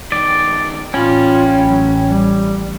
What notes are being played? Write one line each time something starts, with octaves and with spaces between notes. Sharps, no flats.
G2 D#3 D5
A1 C#4 F4 G5 B5
F#3
G3